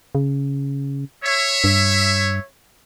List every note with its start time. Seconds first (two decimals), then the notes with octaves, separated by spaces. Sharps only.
0.15 C#3
1.24 C#5 E5
1.64 G2